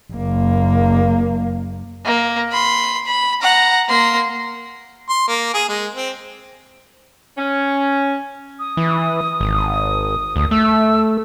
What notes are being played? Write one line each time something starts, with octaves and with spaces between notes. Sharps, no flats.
F#1 A#3
A#3
B5 C6
B5
F#5 A#5
A#3 C6
C6
A#3
G#4
G#3
C4
C#4
D#6
E3
G#1
D2
A3 E6